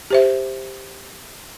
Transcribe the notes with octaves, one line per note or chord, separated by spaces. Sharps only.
G4 C5 E5